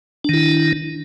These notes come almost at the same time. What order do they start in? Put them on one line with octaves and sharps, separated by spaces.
D4 D#3 E4